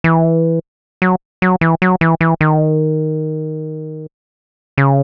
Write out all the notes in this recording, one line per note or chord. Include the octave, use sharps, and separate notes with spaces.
E3
F#3
F#3
E3
F#3
E3
E3
D#3
C#3